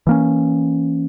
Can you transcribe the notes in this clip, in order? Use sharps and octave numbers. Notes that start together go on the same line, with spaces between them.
E3 A#3 C#4